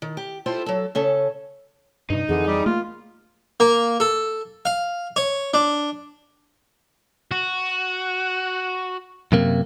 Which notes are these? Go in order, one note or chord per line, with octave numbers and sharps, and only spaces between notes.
D#3
G4
E4 F4 G4 A4 C5
F#3 A4
C#3 C#4 A4
G2 C3 D#4
F2 D3 E3 G#4
G3
A3 A#3 F4
A#3
A4
F5
C#5
D4
F#4
F#2 C3 A#3